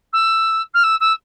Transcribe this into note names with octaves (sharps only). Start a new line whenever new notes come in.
E6
F6
E6
E6